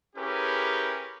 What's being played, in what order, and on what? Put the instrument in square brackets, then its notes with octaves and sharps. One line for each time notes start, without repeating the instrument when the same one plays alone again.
[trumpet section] C#4 E4 G4 G#4 A#4 B4